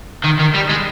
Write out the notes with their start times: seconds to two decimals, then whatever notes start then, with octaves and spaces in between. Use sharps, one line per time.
0.24 D#3
0.39 D#3
0.54 G3
0.69 G#3